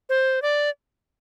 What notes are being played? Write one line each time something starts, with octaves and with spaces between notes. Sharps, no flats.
C5
D5